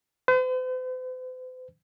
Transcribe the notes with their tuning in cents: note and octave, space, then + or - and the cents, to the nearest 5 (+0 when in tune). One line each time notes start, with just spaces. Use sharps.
C5 -45